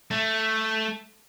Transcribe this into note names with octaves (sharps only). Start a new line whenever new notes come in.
A3